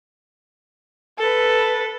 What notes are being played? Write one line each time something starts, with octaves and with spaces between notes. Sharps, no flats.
A4 B4